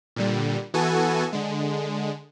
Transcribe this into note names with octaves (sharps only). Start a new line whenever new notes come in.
A#2 D3 G3
E3 B3 F#4 A4 G#5
D3 G#3